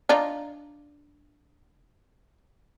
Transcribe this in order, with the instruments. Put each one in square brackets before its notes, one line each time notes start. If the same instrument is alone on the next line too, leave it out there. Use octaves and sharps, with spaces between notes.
[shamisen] D4 D#4 F4